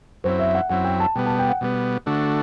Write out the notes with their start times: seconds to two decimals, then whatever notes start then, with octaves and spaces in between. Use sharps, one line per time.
0.24 F#2 F#3 C4 E4 C5
0.39 E5
0.55 F#5
0.70 F#2 F#3 C4 E4 F#5
0.84 G5
1.00 A5
1.15 B2 G3 B3 G5
1.26 A5
1.39 G5
1.50 F#5
1.61 B2 G3 B3
2.06 D3 A3 D4 F#4